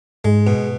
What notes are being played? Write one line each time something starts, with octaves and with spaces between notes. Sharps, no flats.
G#2 G#3
B2